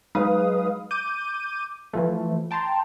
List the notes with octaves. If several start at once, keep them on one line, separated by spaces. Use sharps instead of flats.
F#3 G#3 D#4 B4 F5 D#6
D6 G6 D#7
E3 F3 A3
G5 A5 A#5 C6